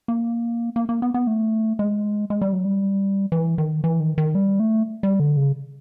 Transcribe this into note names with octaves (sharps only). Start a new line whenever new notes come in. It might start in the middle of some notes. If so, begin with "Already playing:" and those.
A#3
A#3
A#3
B3
B3
A3
G#3
G#3
G3
F#3
G3
E3
D#3
E3
D#3
D#3
G3
A3
G3
D3
C#3